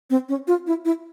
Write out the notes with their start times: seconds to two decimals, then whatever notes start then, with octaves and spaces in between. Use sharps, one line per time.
0.10 C4
0.29 C#4
0.48 F4
0.67 E4
0.85 E4